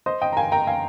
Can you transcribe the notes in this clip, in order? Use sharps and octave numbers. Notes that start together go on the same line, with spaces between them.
C5 D#5
D#5 G5
A#5
F5 G#5
G5 A#5
F5 G#5